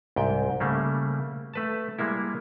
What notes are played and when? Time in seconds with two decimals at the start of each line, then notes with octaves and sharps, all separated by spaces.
0.16 C2 G#2 G5
0.60 C#3 G3 A3 A#3
1.54 A3 B4 A5
1.99 G3 G#3 A#3 E4